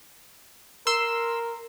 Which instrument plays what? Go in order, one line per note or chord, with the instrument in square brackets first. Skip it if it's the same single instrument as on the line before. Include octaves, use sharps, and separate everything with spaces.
[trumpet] A#4 [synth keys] C6 E6